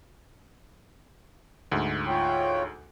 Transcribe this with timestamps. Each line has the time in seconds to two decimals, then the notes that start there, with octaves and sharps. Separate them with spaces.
1.72 D2 G#2
2.08 F4 C#5 G5